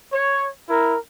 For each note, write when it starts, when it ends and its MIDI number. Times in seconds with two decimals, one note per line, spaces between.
0.13 0.48 73
0.69 0.96 64
0.69 0.96 70